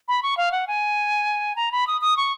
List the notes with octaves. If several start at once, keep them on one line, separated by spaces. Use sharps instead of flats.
B5
C#6
F5
F#5
G#5
A#5
B5
D#6
D#6
C#6